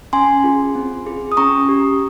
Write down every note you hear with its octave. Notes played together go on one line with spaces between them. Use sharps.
C#4 G#5 C6
F4 G#4
C4
F4 G#4
D#6
C#4 A#5 C#6
G4